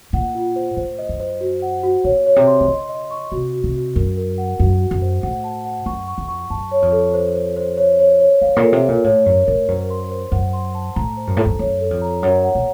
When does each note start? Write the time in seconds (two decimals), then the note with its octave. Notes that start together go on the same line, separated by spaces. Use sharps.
0.13 A#2 F#5
0.35 F4
0.56 C5
0.77 A2 C5
0.99 D#5
1.09 F#2
1.20 C5
1.41 F#4
1.62 F#5
1.83 F#4
2.04 A#2 C#5
2.26 C#5
2.36 C3
2.47 C6
2.61 D#3
2.68 C#3 D#5
2.89 D#5
3.11 C#6
3.32 C3 F#4
3.53 F#4
3.64 C3
3.75 F#4
3.95 F#2 A#4
4.17 A#4
4.38 F#5
4.59 F#2 F#4
4.81 F#4
4.91 F#2
5.02 C5
5.23 A2 F#5
5.44 A5
5.65 F#5
5.86 F#2 C#6
6.08 C#6
6.18 F2
6.28 C#6
6.50 F#2 A5
6.71 C#5
6.82 F2
6.92 A4
7.14 C5
7.35 C5
7.57 C5
7.77 C#5
7.99 C#5
8.20 C#5
8.41 F#2 F5
8.56 A#2
8.62 A4
8.73 C3
8.83 F5
8.88 A#2
9.04 A2 C#5
9.26 F#2 C#5
9.47 A2 A#4
9.68 F#2 C5
9.90 C6
10.11 C5
10.32 F#2 F#5
10.53 C6
10.75 A5
10.95 A2 A#5
11.17 C5
11.27 F#2
11.37 A2 A4
11.46 F#2
11.59 F#2 C#5
11.81 A4
11.91 F2
12.02 A#5
12.23 F#2 C#5
12.44 F#5
12.55 A#2